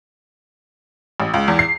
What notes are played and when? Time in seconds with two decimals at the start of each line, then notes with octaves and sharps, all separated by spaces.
1.20 A1
1.34 C#2
1.48 E2
1.59 C7